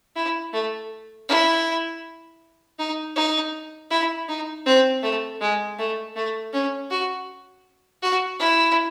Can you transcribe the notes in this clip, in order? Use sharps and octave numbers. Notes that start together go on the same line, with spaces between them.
E4
A3
E4
D#4
D#4
E4
D#4
C4
A3
G#3
A3
A3
C#4
F#4
F#4
E4